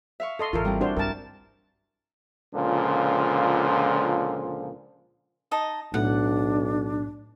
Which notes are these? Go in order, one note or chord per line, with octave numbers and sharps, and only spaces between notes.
E5 F5 C#6
A4 D#5 C6
G#1 E3 F4 A4 A#4
G3 C4 E4
D4 F#4 C5
G2 C3 G3 A#4 A5
C#2 A#2 D3 F3
D#4 D#5 A5
B1 A2 D4 F#5